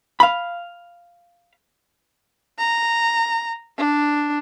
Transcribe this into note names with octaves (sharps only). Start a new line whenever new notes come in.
F5 B5
A#5
D4